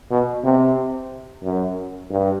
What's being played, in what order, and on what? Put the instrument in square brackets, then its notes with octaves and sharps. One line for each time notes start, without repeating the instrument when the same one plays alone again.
[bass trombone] B2
C3
F#2
G2